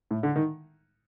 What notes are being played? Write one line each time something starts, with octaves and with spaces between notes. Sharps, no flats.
A2
D3
D#3